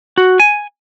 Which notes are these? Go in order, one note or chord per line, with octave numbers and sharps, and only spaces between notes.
F#4
G#5